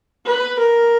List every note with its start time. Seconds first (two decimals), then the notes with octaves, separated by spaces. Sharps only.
0.25 B4
0.59 A#4